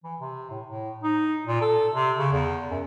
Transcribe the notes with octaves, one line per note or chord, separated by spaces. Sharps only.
E3
C3
A2
A2
D#4
A#2
A4
C3
C#3
E2
F#2